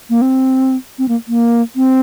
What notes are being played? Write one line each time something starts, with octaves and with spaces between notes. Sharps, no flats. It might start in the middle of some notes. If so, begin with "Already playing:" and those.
A#3
C4
C4
A#3
A#3
C4